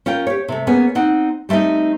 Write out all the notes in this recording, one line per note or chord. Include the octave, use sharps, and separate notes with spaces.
C#4 F4 A#4 G5
G4 C#5
C3 A3
A#3 B3 C#4 G#4
C4 D#4 F#5
G3 A3 A#3 C4 D#4